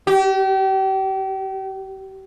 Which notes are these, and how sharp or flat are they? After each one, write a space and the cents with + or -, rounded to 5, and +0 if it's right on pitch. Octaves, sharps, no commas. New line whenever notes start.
G4 -35